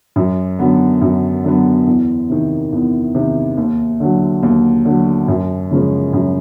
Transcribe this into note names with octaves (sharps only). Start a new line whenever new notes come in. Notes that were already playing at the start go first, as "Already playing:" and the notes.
F#2
D3 F#3 B3
F#2
D3 F#3 B3
E2
C3 D#3
E2
C3 D#3
D#2
D3 F#3
D#2
D3 F#3
F#2
C#3 F3 G#3 C#4
F#2